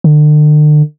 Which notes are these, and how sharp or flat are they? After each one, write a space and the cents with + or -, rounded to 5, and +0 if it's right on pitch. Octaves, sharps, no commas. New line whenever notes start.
D3 +40